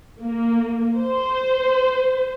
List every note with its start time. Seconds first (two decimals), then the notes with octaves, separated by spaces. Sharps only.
0.21 A#3
0.96 C5